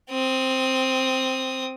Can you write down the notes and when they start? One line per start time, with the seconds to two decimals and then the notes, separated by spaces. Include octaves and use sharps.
0.11 C4 D#6